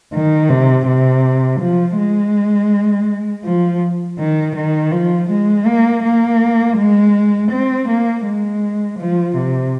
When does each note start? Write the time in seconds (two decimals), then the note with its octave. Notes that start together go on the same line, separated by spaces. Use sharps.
0.13 D#3
0.49 C3
0.86 C3
1.60 F3
1.97 G#3
3.44 F3
4.19 D#3
4.55 D#3
4.92 F3
5.30 G#3
5.66 A#3
6.04 A#3
6.77 G#3
7.51 C4
7.88 A#3
8.25 G#3
8.98 F3
9.36 C3